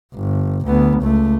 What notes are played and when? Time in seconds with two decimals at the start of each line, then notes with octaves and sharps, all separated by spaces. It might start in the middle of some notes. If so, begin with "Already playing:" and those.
0.15 G1
0.66 D2 B3
1.02 C#2 A3